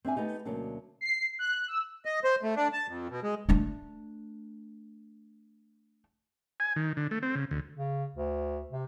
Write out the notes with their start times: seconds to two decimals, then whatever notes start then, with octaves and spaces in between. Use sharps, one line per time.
0.05 C4 D4 E5 G#5
0.16 A3 B3 C#4 D#4 G4
0.45 D2 B2 F#3 A#3 C#4 D4
1.01 C7
1.39 F#6
1.68 E6
2.05 D#5
2.24 C5
2.43 A3
2.56 D4
2.73 A5
2.88 F2
3.10 B2
3.23 G#3
3.49 A3 D4
6.60 G#5
6.76 D#3
6.97 D3
7.11 A3
7.22 C4
7.35 C#3
7.51 D2
7.75 C#3
8.15 D2
8.72 C3